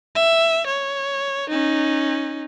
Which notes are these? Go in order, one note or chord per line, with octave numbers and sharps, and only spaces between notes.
E5
C#5
C#4 D#4